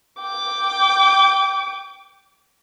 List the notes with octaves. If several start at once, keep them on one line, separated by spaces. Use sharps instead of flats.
G5 D6